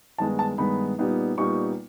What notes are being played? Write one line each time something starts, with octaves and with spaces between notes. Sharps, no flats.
G2 D#3 G#3 B3 D#4 A5
A5
G2 D#3 G#3 B3 D#4 B5
A#2 G3 B3 D#4
A#2 G3 B3 D#4 C#6